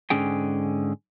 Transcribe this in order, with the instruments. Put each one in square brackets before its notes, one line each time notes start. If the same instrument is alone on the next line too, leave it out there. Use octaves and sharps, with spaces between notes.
[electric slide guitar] G#2 D3 C#4 G#4 G5